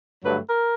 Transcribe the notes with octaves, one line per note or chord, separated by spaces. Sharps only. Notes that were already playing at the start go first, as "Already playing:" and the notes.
G2 D3 F#3 A3 B4
A#4